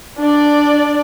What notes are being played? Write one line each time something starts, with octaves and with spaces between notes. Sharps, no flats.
D4 D5